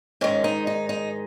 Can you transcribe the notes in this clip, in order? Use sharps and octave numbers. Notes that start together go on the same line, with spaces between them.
G#2 D#3 G#3 C#4
D#4
D#4
D#4